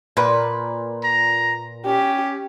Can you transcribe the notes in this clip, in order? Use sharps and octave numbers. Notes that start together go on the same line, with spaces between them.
A#2 B4
A#5
C#4 G4